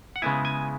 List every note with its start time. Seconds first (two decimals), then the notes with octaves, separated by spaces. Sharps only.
0.16 F#5
0.22 C#3 G#3 B3 E4 G#5
0.45 G#5